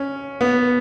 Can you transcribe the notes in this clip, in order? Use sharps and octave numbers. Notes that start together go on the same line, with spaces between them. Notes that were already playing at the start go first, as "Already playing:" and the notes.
Already playing: C#4
B3